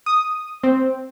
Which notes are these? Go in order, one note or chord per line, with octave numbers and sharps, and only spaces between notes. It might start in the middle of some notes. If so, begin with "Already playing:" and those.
D#6
C4